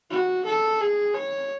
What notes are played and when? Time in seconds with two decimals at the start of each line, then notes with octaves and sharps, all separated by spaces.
0.10 F#4
0.46 A4
0.80 G#4
1.14 C#5